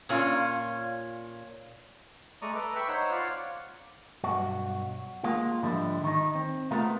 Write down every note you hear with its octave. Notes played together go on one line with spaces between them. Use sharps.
A#2 C#4 F4
G#3 A3 D5 A#5 C#6 D#6
A4 B4 A#5 D6
E5 G5 B5 C#6 E6
D#4 C5 C#5 F#5
F4 C#5 D5 F5 F#5
B1 G2 F#4
G#3 A#3 F4
G#2 D3 F3 G3 E4
D#3 D#4
C4
C3 G#3 A3 B3 F4 A#4